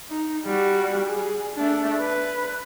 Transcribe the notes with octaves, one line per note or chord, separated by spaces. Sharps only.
D#4
G3 F#4
G#4
A3 D4
B4